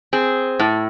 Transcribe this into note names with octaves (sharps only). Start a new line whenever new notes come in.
C4 G#4
A2